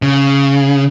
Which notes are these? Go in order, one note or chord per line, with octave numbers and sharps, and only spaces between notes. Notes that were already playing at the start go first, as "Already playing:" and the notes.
C#3